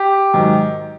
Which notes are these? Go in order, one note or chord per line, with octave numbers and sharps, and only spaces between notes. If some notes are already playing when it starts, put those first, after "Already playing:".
Already playing: G4
G#2 D#3 F#3